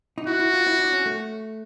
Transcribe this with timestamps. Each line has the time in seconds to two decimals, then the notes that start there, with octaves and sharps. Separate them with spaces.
0.18 D#4
0.27 E4 F#4
0.40 E4
0.54 F4
0.67 E4
0.79 D4
0.92 C#4
1.06 A3